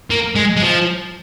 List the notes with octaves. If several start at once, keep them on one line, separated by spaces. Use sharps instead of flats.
A#3
G#3
G#3
F3